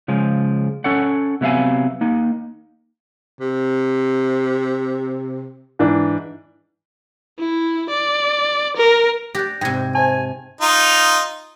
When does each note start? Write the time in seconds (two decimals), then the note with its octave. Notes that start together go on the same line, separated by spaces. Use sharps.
0.08 C#3 F3 G#3
0.84 C#4 A4 C#5 F#5
1.41 C3 F#3 B3 E5 F5 G#5
2.01 A#3 D#4
3.40 C3
5.79 G#2 E3 D4
7.39 E4
7.89 D5
8.76 A#4
9.35 G4 D5 F#6 G6 A#6
9.61 G#2 C3 G5 G#6
9.95 C5 G#5 A5
10.61 D#4 F4